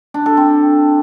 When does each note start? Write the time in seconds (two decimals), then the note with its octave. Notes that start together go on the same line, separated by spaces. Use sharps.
0.14 D4
0.26 A4
0.37 C4